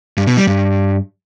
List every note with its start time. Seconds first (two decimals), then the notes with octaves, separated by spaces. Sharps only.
0.17 G2
0.27 B2
0.37 G3
0.47 G2